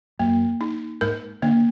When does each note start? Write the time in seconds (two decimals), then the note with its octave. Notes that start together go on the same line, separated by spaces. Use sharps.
0.19 F#2 A#3
0.61 D#4
1.01 G#2 A#4
1.42 D3 A#3